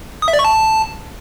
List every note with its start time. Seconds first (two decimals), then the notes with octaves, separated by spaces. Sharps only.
0.22 D#6
0.28 E5
0.33 D5
0.39 C#6
0.45 A5